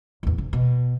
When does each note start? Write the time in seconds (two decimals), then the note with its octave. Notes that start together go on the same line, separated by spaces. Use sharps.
0.23 D1 E2
0.38 C#3
0.53 B2